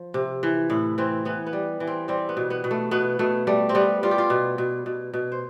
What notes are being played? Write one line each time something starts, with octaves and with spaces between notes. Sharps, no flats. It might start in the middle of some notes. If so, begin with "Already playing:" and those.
Already playing: F3
C3
E3
A2 E4
E3 C4
E3 B3
B3
G3
E3
C4
G3 C4
B3
B2
B3
B2
A3
B2 B3
B2 A3
G3 A3
C4
G3 B3
G3 F4
G4
F4
B2
B2
B2
B2
C5